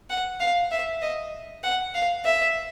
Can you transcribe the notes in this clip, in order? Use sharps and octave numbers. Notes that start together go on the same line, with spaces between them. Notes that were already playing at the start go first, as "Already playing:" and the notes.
F#5
F5
E5
D#5
F#5
F5
E5